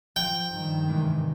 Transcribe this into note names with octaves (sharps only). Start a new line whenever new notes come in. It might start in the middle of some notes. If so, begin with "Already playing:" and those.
F3 G5
G2 D#3
G#2 C3 E3